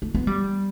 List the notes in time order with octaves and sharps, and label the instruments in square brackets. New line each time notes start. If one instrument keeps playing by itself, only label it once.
[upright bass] A3
B3
G3